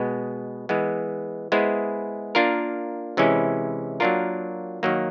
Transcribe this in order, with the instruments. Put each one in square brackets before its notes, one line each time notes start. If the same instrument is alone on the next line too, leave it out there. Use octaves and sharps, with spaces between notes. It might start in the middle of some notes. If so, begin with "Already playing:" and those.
Already playing: [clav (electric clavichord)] B2 G#3 B3
E3 G#3 B3
G#3 B3 E4 G#4 C5
A#3 D4 F4 A#4
C3 E3 G#3 C#4 E4
F#3 A#3 D4 F4 A#4
D#3 F#3 A#3